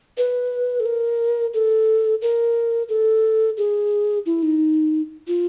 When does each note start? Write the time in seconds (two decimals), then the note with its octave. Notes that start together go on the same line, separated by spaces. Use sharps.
0.18 B4
0.80 A4
0.86 A#4
1.54 A4
2.22 A#4
2.89 A4
3.57 G#4
4.26 E4
4.43 D#4
5.27 F4